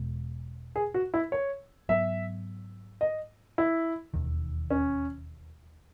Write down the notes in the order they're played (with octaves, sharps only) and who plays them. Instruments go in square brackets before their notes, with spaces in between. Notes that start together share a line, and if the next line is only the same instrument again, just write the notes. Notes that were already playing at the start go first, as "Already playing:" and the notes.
Already playing: [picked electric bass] E1 E2 B2 G#3
[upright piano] G#4
F#4
E4
C#5
[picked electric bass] G#2 F#3 B3 [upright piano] E5
[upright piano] D#5
E4
[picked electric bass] E1 D#2 D#3
[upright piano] C#4